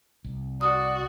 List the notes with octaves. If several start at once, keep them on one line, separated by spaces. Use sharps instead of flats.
C2
F#4 D5 D#6